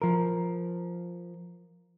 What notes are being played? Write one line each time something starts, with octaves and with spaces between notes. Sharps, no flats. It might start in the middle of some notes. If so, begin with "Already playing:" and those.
F3 A#4